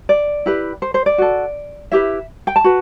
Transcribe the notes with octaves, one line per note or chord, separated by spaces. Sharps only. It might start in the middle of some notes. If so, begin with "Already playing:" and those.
D5
E4 G4 B4
C5
C5
D5
F#4 A4
E4 G4 B4 E5
G5
A5
F#4 B4